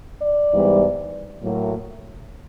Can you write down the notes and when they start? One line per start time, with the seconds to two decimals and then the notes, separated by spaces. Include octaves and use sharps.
0.22 D5
0.52 G#2 E3 G3 B3
1.42 A2 F#3 A#3